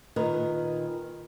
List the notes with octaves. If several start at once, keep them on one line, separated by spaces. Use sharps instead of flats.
A#2 D#3 A#4 B4